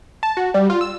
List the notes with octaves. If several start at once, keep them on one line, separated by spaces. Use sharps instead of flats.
A5
F#4
G3
F4
E6